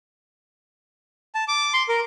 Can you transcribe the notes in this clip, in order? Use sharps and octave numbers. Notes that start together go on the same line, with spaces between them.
A5
D6
C6
A#4